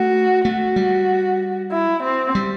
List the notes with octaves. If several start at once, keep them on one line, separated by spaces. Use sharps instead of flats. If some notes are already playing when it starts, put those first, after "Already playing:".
Already playing: A3 F#4
A3 F#4
G3
E4
C4
G3